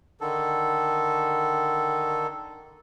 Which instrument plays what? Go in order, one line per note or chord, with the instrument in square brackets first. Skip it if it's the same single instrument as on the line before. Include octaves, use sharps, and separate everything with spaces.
[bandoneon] D3 D#3 A4